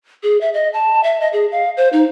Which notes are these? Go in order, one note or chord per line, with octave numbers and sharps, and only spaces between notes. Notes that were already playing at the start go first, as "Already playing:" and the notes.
G#4
E5
D#5
A5
E5
D#5
G#4
F5
C5
D#4